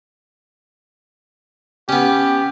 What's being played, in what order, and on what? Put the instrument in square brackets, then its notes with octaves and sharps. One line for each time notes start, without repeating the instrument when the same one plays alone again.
[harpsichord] B3 C#4 [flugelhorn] G4